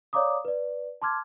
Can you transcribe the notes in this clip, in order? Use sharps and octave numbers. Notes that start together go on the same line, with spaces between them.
C#5 D5 F5 A#5 D6 D#6
B4 D5
A5 C6 D6 F6 G#6